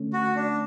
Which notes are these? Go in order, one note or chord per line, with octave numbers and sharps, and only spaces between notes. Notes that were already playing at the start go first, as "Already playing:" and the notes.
Already playing: D3 A3 C#4
F#4
D4